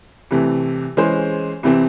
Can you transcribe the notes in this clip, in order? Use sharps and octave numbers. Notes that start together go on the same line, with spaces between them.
C2 C3 E3 A3
E3 G#3 C#4 G#4 C5
C2 C3 E3 C4